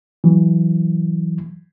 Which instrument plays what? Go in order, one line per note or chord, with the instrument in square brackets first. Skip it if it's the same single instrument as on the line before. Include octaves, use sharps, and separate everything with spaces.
[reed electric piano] E3 F#3